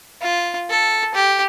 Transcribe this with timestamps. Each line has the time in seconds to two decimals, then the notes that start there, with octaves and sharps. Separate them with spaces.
0.22 F4
0.70 A4
1.15 G4